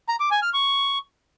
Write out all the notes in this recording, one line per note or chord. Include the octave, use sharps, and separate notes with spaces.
A#5
D6
G#5
F6
C#6